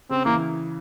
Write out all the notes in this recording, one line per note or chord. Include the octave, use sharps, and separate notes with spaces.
C#3 C4
E3 A#3